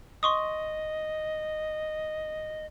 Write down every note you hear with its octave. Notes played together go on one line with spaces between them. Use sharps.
D#5 C6 C#6 D#6